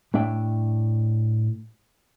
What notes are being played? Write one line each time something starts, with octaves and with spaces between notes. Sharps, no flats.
A2 A3 D4 E5 G5